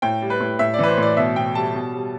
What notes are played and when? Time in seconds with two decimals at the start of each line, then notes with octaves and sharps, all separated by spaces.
0.02 A2 G5
0.22 G3
0.30 B4
0.40 A2
0.59 A2 E5
0.74 D5
0.79 E3 B4
0.88 C5
0.97 A2
1.02 D5
1.17 B2 E5
1.36 B2 G5
1.55 G3 A5
1.74 B2
1.94 G3